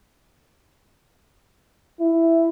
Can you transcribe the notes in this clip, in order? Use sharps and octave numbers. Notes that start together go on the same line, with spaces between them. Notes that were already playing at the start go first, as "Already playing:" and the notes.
E4